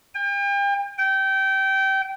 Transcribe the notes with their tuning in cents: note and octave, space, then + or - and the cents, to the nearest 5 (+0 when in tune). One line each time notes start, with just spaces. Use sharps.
G5 +40
G5 -20